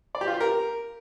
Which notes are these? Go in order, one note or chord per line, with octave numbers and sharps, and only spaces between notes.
D5
G4
F4
G4
A#4